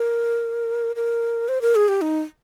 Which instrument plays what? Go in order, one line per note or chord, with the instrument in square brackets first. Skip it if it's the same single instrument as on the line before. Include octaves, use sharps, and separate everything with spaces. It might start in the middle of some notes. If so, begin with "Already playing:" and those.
Already playing: [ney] A#4
A#4
C5
A#4
G#4
G4
D#4